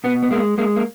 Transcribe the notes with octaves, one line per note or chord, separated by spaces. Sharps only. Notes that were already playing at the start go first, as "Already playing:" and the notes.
B2 B3
B3
G#3 A#3
G#3 A#3
A#3